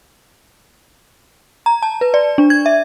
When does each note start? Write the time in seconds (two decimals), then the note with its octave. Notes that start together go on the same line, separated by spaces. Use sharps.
1.66 A#5
1.82 A5
2.01 B4
2.14 D5
2.38 D4
2.50 G#6
2.66 E5